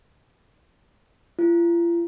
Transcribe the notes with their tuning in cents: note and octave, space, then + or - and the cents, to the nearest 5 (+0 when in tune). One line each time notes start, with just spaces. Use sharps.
F4 -45